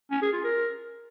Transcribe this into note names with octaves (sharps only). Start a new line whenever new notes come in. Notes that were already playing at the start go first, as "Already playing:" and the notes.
C#4
G#4
F4
A#4